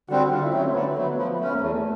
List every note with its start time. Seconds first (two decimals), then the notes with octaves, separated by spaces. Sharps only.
0.09 D3 G3 C4 F#4
0.31 D3 F4
0.42 E4
0.53 F#3 A3 C#4
0.64 C4
0.74 D3 B3
0.96 F#3 A3
1.17 F3
1.40 A3 C#4
1.55 A#3
1.61 E2 A3